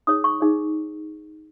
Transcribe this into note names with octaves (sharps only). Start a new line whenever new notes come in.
D#4 G#4 C#5 D#6
C#6
D#4 G#4 C#5